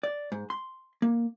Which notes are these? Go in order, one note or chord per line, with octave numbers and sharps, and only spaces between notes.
D5
G#2
C6
A#3